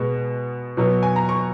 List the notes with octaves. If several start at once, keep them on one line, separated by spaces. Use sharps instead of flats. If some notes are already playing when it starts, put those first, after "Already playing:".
Already playing: B2 G#3 B3
B2 F#3 B3
G#5
A#5
C#6